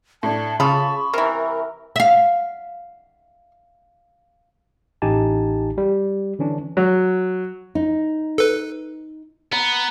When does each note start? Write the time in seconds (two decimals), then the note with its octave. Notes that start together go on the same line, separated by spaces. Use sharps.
0.23 A2 D4 A5
0.60 C#3 F4 A4 B5 C#6 D#6
1.14 C3 E3 A#4
1.96 E5 F5
5.02 A1 D#4 G4 G#5 A5
5.78 G3
6.39 D3 E3 C#4 D4
6.77 F#3
7.75 D#4
8.38 A4 B4
9.52 B3 A#5